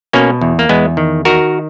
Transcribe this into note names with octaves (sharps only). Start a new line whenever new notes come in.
B2 A#3 C#4
E2
A#3
E2 G#3 B3
D#3
D#3 F#4 A#4